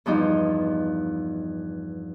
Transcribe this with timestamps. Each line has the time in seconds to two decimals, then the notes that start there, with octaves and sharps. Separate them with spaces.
0.06 E2 G2 F3 D#4